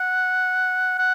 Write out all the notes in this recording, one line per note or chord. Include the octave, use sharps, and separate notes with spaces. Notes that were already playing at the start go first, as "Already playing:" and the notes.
Already playing: F#5
F#5